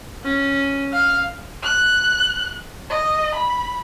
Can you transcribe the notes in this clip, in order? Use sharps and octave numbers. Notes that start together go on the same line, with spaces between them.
C#4
F5
F#6
D#5
B5